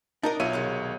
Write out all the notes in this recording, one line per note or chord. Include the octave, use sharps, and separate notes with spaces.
D4 D#4 A#4 D#5
B1 F4 C#5 E5 D#7
C2 D#3 G#3